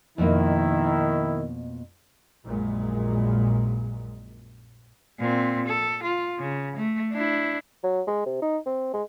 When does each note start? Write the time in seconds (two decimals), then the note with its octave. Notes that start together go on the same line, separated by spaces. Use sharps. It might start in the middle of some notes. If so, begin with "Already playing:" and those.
0.18 F2 B2 D#3 A#3 E4
2.46 A#1 F#2 A#2 G#3
5.20 A#2 C4
5.67 A4
6.03 F4
6.39 C#3
6.76 A3
7.12 D4 E4
7.83 F#3
8.07 G#3
8.26 C3
8.42 D#4
8.66 C4
8.93 G#3